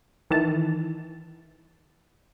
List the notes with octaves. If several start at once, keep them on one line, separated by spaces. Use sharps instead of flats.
D#3 E3 A5